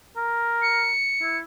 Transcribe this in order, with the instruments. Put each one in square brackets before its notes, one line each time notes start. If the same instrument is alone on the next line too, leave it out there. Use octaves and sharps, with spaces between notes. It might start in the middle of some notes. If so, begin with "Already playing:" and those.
[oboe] A#4
[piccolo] C#7
[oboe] E4